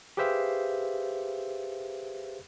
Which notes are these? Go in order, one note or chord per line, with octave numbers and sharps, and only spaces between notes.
G4 G#4 B4 C5 E5 F5